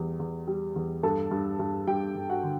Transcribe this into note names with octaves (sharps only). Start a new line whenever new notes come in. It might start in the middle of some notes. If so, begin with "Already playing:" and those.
Already playing: E2 G3
E2
G3
E2
G2 A4 A5
G2
G2
G2 G4 G5
G2
F#4 F#5
D3